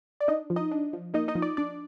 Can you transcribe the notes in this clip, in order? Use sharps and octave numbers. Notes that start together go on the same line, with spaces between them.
D5
D4 D#4 D#5
F3
D#4 D#5
D4
F3
A#3 D#4 D#5
D#4 D#5
F3
D5
D4 D5